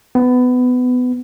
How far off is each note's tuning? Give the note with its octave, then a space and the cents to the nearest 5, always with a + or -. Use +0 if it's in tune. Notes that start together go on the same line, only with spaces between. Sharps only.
B3 +20